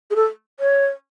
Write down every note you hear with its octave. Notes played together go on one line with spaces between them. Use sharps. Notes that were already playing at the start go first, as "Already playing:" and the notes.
G#4
A4
C#5